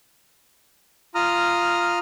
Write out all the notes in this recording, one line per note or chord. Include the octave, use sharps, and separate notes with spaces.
F4 A#5 D#6 F6